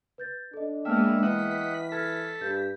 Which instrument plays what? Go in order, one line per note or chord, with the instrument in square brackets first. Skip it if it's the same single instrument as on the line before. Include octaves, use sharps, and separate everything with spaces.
[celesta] B4 G6 A6
[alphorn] D4 [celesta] A4 D#5
[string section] G#3 A#3 B3 [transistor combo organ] E5 [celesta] G5 A5 F6
[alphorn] E3 [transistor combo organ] D#5 F#5 [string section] B6
[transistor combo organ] A4 [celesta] F6 G#6
[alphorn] G2 [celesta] G6